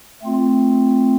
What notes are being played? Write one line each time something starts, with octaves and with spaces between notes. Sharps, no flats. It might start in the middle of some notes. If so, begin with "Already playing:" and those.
A3 C4 F4